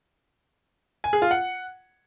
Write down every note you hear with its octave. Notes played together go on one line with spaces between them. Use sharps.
G#5
G#4
F4
F#5